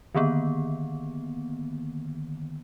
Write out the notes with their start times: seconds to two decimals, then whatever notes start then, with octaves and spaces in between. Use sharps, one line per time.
0.15 D3 D#3 A#3 B3